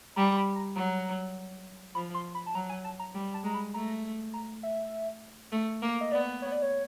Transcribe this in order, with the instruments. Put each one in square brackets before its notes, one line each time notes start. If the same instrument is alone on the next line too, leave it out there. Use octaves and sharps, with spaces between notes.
[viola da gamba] G3 [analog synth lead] A#5
[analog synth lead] B5
A#5
[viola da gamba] F#3 [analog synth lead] A#5
[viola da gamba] F3 [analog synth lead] B5
[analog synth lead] C6
B5
A5
[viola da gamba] F#3 [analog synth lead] A#5
[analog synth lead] G#5
A5
A#5
[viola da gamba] G3
[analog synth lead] A5
[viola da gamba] G#3 [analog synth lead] A#5
[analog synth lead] B5
[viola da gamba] A3 [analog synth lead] A#5
[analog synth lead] A#5
E5
[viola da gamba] A3
A#3
[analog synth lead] D#5
[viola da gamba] B3 [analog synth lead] D5
[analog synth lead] C#5
D5
C#5